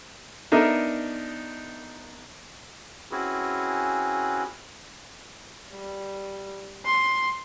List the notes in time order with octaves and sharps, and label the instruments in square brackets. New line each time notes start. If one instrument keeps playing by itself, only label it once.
[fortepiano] B3 D4 D#4 A#4 D#5 E5
[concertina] C4 C#4 E4 F#4 G#4 B4
[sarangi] G3
C6